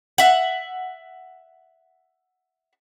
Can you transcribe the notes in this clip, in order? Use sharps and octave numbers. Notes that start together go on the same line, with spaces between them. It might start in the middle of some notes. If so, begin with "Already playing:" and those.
E5 F#5